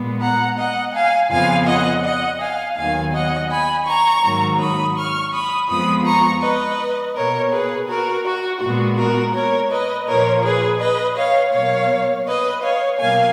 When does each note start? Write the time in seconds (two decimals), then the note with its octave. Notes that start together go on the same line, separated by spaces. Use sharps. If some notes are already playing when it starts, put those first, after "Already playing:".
Already playing: A#2 G#3 B3
0.22 F#5 A#5
0.58 D#5 F#5
0.94 F5 G#5
1.31 F2 C#3 F3 B3 F5 G#5
1.67 D#5 F#5
2.04 D#5 F#5
2.41 F5 G#5
2.77 D#2 D#3 F#3 B3 F5 G#5
3.13 D#5 F#5
3.50 G#5 B5
3.88 A#5 C#6
4.24 G#2 D#3 F#3 A#3
4.60 B5 D#6
4.96 C#6 F6
5.33 B5 D#6
5.69 F2 F3 G#3 B3 B5 D#6
6.06 A#5 C#6
6.42 B4 D#5
7.15 B2 A#3 A#4 C#5
7.52 G#4 B4
7.88 F#4 A#4
8.26 F#4
8.62 A#2 G#3 B3 F#4
8.98 F#4 A#4
9.35 A#4 C#5
9.71 B4 D#5
10.07 A#2 F3 A#3 A#4 C#5
10.44 G#4 B4
10.81 B4 D#5
11.17 C#5 F5
11.54 B2 F#3 A#3 C#5 F5
12.27 B4 D#5
12.63 C#5 F5
12.99 B2 F#3 A#3 F5 G#5